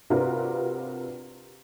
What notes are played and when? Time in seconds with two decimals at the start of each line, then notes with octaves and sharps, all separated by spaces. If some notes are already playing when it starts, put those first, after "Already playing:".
0.10 C3 D4 F4 F#4 A#4 B4